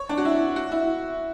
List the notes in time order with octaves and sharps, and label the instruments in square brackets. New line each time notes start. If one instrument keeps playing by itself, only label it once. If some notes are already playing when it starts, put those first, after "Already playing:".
Already playing: [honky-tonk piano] C#5
D4
F#4
E4
F#4
E4